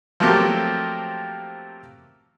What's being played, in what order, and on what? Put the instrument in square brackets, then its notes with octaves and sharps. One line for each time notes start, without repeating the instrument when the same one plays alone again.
[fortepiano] F3 F#3 A3 A#3 C4 G4